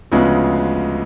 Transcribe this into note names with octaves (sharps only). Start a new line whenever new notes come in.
D2 C#3 F3 G#3 B3